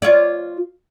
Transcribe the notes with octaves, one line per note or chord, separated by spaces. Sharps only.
F4 C#5 D5